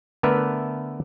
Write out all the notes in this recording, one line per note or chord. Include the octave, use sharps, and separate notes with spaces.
D3 A3 B3 A#4 B4 E5